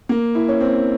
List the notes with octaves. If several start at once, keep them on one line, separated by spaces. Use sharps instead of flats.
A#3
E4
C#4
C4